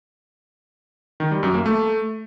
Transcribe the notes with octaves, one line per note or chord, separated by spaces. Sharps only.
D#3
G3
F#2
A#3
A3